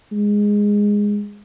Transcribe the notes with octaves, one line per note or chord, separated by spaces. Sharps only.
G#3